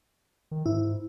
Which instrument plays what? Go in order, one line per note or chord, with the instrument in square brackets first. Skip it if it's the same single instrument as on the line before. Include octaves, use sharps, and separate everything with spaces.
[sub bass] D#3
[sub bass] G#2 [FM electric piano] E4